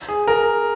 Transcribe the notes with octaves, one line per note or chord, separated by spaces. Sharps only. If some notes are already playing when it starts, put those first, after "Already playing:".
G#4
A#4